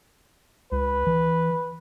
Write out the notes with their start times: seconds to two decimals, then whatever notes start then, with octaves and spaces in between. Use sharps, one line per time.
0.72 C#2 B4
1.07 E3